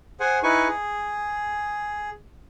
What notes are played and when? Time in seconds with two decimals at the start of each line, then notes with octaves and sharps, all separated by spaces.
0.20 G#4 C5 F#5 G#5
0.43 D#4 E4 B4 G#5 C#6
0.68 G#4